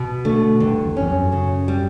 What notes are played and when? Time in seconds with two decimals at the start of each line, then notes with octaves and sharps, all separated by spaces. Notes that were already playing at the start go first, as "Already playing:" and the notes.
Already playing: B2
0.25 D3 A3
0.60 G2 D3
0.85 E2
0.97 C#4
1.02 E2
1.09 F#2
1.32 C#3
1.68 G3